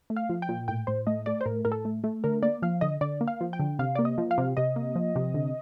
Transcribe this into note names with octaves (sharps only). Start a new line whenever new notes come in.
A3
F5
F3
G5
A#2
A2 G5
A2 C5
A3 D#5
A3 D5
C5
A2 A#4
A2 A#4
A4
A3
A3
D3 A#4
A#3 D5
F3 F5
D3 D#5
D3 D5
A#3
F5
F3
G5
D3
C3 F5
A#3 D5
D#5
F3
F5
C3
C3 D#5
A#3
F3
C3
D3